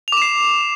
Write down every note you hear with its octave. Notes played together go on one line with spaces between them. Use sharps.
D6 C7 E7 F7